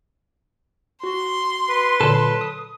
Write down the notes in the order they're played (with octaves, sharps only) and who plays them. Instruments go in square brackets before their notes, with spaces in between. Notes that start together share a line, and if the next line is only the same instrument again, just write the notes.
[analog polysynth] F#4 [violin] C6
[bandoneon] B4
[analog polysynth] A#2 D3 F#3 [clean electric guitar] A4
[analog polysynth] D#6